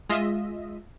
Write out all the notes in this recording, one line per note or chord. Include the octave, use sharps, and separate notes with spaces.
G#3 F4 D#5 E5